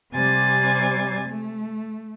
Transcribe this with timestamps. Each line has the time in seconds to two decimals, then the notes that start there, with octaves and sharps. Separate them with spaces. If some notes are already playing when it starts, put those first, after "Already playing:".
0.14 C3 G3 C4 G#5 G#6 A6
1.27 A3